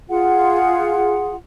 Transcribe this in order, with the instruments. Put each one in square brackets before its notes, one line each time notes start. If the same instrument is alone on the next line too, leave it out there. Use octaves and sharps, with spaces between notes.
[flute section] F4 G#4 F#5